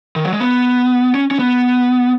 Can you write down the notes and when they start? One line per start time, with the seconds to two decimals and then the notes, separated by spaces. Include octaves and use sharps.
0.16 D#3
0.25 F#3
0.33 G#3
0.40 B3
1.14 C#4
1.31 C#4
1.39 B3